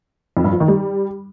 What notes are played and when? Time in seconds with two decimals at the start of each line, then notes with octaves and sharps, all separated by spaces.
0.37 F2
0.44 G2
0.52 F3
0.60 D#3
0.68 G3